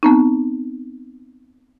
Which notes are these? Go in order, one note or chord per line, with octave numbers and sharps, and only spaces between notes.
B3 C4 D#4